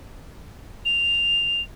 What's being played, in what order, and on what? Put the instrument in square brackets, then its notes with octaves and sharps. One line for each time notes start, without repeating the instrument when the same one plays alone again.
[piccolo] F7